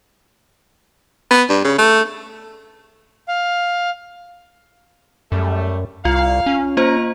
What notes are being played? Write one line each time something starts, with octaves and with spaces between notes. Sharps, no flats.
B3
G2
C#3
A3
F5
F#2 G3 A3
C2 F4 F5
C#4
A#3 F4 C5 A#5